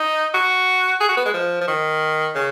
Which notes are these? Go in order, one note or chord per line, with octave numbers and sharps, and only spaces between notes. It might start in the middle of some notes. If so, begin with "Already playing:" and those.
Already playing: D#4
F#4
G#4
F#4
B3
G#3
F3
F3
D#3
C#3